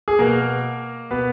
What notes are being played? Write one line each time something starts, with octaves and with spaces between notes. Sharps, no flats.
G#4
B2 A#3 A#4
B2 B3 B4